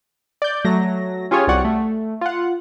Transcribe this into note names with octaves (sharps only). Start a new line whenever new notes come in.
D5 G6
F#3 A3 A#6
C#4 F4 G4 G#4 C#5
C2 F#4 G4 D5 F#5 C#6
A3
F4 F#5